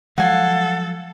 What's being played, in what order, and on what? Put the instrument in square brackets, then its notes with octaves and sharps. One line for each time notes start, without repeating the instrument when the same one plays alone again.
[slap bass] F3 F#3 G#3 [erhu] A4 [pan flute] F5 [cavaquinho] F#5 G#5